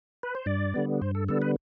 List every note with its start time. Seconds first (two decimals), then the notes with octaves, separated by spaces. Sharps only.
0.23 B4
0.35 C5
0.46 G2 D5
0.74 D3 G3 B3
1.02 G2 C5
1.15 A4
1.28 D3 G3 B3 A4
1.42 B4